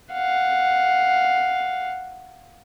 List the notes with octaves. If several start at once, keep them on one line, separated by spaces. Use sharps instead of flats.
F5 F#5